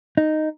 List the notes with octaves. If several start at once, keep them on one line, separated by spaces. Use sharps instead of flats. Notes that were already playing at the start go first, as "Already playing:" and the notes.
D#4